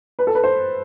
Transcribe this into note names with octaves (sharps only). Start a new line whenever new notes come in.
B4
A4
B4
C5